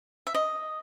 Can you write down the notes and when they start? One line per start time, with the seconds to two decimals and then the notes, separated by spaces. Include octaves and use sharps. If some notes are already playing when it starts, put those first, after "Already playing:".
0.27 E5
0.34 D#5